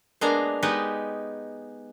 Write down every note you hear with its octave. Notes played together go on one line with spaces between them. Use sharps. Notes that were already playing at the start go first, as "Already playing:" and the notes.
G#3 A#3 B3 D4 F5 A#5
G#3 B3 D#4 G4 B4